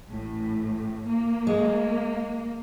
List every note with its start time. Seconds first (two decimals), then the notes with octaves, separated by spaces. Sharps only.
0.10 A1 A2
1.08 A#3
1.47 G#3